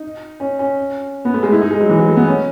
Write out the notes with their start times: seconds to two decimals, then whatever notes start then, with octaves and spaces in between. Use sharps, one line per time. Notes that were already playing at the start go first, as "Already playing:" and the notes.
Already playing: D#4
0.40 C#4
0.59 C#4
1.25 B3
1.34 A3
1.43 G#3
1.52 E4
1.62 D#4
1.71 G#3
1.81 F#3
1.90 E3
1.99 F#3
2.09 A3
2.17 B3
2.27 C#4